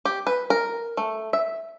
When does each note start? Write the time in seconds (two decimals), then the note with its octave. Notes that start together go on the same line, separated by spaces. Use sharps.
0.05 G4
0.27 B4
0.50 A#4
0.97 A3
1.33 E5